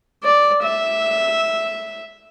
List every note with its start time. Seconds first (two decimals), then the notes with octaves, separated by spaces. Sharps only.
0.24 D5
0.63 E5